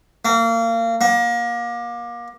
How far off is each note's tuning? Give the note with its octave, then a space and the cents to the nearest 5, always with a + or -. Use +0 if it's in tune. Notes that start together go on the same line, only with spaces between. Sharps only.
A#3 -30
A#3 +30